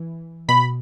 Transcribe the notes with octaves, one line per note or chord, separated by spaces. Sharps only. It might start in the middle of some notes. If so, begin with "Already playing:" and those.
Already playing: E3
B2 B5